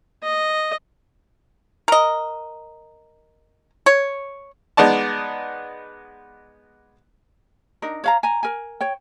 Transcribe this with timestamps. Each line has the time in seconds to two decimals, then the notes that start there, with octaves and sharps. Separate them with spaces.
0.23 D#5
1.88 A#4 D#5
3.86 C#5
4.77 G#3 B3 D#4 D5 A5
7.82 D4 D#4 A#4
8.04 C#5 F5 A#5
8.23 G#5 A#5
8.43 A#4 G#5
8.81 C#5 G5